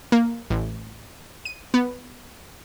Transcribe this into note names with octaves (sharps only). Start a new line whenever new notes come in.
A#3
A1
D#7
B3